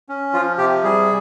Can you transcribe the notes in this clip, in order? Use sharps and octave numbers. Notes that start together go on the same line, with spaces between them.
C#4
F3 F4
C3 G4
G3 G#4